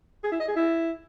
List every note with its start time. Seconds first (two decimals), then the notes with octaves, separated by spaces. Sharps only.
0.24 G#4
0.32 E4
0.40 D#5
0.48 G#4
0.56 E4